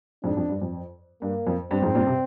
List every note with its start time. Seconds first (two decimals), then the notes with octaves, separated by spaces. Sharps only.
0.24 F2 G#2 D4
0.37 F2
0.49 G2
0.62 F2
1.22 G2 A#3
1.47 F2
1.71 G2 C4
1.82 F2 G#2
1.95 G2 A#2
2.07 C3